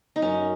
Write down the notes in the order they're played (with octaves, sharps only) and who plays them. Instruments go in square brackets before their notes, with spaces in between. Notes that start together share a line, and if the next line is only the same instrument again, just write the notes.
[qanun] D#4
[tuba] F#2 [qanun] C#4